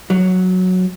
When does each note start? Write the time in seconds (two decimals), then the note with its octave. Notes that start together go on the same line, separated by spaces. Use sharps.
0.10 F#3